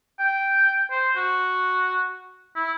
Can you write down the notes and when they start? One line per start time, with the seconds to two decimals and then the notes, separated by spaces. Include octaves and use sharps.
0.19 G5
0.91 C5
1.16 F#4
2.56 E4